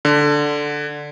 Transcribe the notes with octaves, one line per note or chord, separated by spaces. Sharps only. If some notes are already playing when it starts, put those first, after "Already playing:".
D3